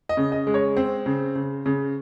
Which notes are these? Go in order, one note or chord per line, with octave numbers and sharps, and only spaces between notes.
D#5
C#3
D#5
G#3
C#5
C4 C5
C#3
C#3
C#3